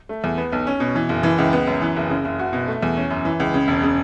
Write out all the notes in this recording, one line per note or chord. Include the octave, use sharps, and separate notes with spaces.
A3
E2
B3
B1
C#4
B2
E3
F#1
E3
C#2
B3
F#2
E3
F#1
C#3
F#1
F#4
B2
A3
E2
C#4
F#2
E3
C#2
C#3
E1
C#3